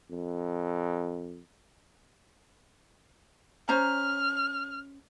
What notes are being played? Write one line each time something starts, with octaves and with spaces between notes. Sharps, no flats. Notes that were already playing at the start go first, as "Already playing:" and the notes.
F2
C#4 C5 A#5 F6